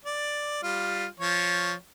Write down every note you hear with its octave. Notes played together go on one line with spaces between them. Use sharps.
D5
G3 F4
F3 C#5